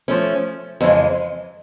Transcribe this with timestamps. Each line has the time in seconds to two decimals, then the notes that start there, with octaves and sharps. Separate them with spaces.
0.08 F3 A3 C#4
0.81 F2 C#3 E3 G#3